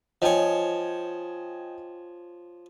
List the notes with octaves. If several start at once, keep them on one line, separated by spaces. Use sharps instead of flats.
F3 C#5 D#5 G5 G#5